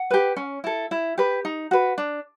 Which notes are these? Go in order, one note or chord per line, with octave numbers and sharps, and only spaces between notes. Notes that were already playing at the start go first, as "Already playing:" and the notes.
Already playing: F#5
G4 B4
C#4
E4 A4
E4
G4 B4
D#4
F#4 B4
D4